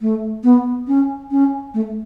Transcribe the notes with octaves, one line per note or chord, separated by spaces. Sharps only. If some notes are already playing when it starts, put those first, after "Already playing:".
A3
B3
C#4
C#4
A3